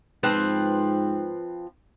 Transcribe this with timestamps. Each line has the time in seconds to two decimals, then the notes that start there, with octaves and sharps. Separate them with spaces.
0.23 G#2 F3 C4 B4